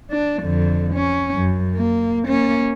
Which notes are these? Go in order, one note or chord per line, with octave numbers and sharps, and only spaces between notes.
D4
F2 D3
C#4
F#2
A#3
A#3 C#4